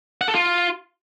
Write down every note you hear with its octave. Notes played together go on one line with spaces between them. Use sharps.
F#5
A4
F4